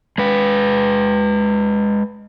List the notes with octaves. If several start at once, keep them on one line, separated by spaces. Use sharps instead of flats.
G#3 B4